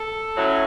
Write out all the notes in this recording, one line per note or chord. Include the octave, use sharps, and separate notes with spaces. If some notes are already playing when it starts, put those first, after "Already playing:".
Already playing: A4
A2 F#3 A3 C#4